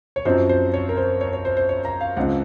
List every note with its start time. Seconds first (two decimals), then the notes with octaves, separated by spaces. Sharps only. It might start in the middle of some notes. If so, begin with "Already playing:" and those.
0.16 C#5
0.25 F#2 F3 C4 D#4 C5
0.49 C5
0.74 C#5
0.89 A#4
0.97 C5
1.21 C#5
1.33 C#5
1.45 C5
1.57 C5
1.69 C#5
1.85 A#5
2.01 F5
2.17 C#2 C#3 F3 C4 D#4 F#5